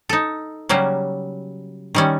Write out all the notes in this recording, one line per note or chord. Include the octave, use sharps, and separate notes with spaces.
D#4 A4
C#3 F#3 G3 A#3 C#4
D#3 G3 C#4